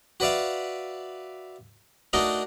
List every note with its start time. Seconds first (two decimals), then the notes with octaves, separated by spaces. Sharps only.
0.20 F#4 B4 D5 E5 F5
2.13 A3 D4 D#4 F#4 A#4 D#5